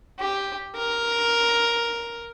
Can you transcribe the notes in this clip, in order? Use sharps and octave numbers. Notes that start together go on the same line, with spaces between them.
G4
A#4